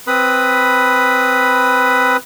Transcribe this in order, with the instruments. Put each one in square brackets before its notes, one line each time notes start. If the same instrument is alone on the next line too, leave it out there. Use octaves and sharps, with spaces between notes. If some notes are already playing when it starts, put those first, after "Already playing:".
[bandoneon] C4 B4 B5 D#6